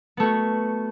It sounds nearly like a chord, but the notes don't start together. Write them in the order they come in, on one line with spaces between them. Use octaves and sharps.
B3 A3 F#4